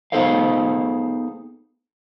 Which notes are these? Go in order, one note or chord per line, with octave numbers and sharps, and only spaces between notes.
B3 D#4 G#4 A4 C5 F5